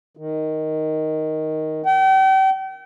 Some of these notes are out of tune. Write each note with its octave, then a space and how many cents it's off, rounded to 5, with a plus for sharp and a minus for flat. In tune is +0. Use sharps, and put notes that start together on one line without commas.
D#3 +5
G5 -40